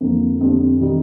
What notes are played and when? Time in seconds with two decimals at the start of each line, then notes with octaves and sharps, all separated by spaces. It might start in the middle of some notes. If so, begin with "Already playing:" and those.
0.01 F2 D3 F3 A#3
0.41 F2 D3 G3 D4
0.80 C3 D#3 G3